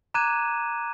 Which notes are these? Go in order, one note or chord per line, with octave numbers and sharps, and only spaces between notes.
A#5 D6 F#6 G#6 D#7 E7